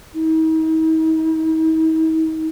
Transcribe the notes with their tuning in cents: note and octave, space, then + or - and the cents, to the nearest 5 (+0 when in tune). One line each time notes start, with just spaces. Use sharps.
D#4 +45